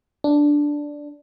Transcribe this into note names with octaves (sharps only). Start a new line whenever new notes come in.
D4